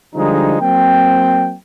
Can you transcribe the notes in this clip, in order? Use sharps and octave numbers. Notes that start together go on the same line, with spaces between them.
D3 F3 G3 G#3 D#4
F#3 A#3 C4 G5